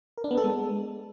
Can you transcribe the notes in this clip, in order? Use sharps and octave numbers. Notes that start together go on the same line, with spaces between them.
A#4
D4
B3
A4
G#3